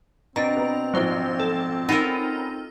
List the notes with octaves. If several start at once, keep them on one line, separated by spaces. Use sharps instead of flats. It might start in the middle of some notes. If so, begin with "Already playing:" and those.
B2 C4 D4 A#5
B3
A#1 G#2 F3 F#3 C5
A4
C#4 D#4 F4 A4 A#4 F#5 B5